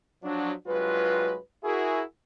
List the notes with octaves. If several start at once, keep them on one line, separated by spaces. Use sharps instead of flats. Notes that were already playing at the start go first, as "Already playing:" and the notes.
F3 F#3 D4
C2 G2 F#3 G#3 F4 B4
E4 F#4 G#4 A#4